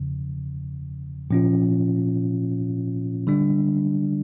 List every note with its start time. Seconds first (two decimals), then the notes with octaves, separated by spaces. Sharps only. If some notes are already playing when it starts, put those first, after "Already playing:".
Already playing: E2 C#3 F3
1.31 A#2 F3 C#4 F4
3.27 D3 G3 D4